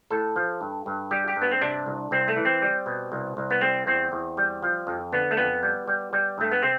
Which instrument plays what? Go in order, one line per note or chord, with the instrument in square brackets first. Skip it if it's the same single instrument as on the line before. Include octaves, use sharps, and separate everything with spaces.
[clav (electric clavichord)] A2 A4
F3
G2
G2
G3 G4
G4
G2
B3
C4
C3 D4
C2
C2 C4
A3
E3
C4
G3
B2
C2
C2
B3
G3 C4
E2 C4
E2
G3
F3
F2
D3 B3
A3
F2 B3
G3
G3
G3
G2 A3
B3
C3 C4